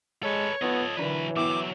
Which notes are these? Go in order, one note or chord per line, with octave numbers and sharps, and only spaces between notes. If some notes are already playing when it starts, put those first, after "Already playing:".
G#3 A4 B4 C#5
B3 D#4 F4 A4 D#5
D3 E3 F#3 D4 B4 D5
F#3 B3 E4 E5 D6